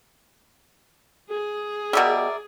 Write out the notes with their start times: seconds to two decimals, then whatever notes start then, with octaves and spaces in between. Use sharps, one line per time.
1.30 G#4
1.93 B2 G3 A#4 D5 E5